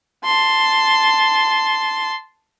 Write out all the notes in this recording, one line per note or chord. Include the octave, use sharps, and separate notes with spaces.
A5 C6